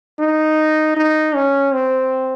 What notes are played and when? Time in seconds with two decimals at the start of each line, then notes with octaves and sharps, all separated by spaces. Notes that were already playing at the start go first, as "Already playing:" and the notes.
0.19 D#4
0.97 D#4
1.35 C#4
1.73 C4